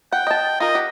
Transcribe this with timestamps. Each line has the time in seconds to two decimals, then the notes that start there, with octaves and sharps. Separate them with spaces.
0.13 F#5 G5
0.27 D#5 A5
0.60 F4 A#4 D#5
0.75 G4 F#5